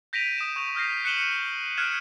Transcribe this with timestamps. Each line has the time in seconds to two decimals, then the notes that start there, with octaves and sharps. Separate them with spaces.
0.13 G6 A#6 B6 D7 D#7 F7
0.38 D#6 E7
0.56 C#6 G6 F7
0.75 D#6 F6 G6 A#6 C7
1.05 F#6 C#7 D#7 E7 F#7 G7
1.77 F6 F#6 G#6 C#7 D7 E7